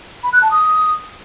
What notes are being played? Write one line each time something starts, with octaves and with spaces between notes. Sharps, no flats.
B5
F#6
A5
D#6